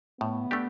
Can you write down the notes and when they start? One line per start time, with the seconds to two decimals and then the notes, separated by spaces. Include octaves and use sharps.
0.20 A2 B3
0.51 A3 D4 G4